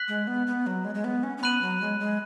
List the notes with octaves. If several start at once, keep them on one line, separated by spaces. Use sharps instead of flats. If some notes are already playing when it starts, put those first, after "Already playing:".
Already playing: F#6 B6 F#7
G#3
B3
B3
F#3
G#3
G#3
B3
C#4
C#4
B3 B5 F#6 D#7 F#7
F#3
G#3
G#3